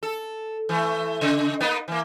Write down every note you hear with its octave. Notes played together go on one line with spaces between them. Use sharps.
A4
E3 A3
C#3
A#3 B3 D#4
E3 A#3